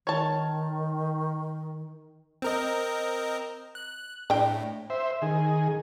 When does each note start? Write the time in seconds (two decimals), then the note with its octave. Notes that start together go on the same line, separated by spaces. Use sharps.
0.07 D#3 C#5 A5
2.42 C4 A#4 D#5
3.75 F#6
4.30 A2 D4 G5
4.90 C5 E5
5.22 D#3 G#4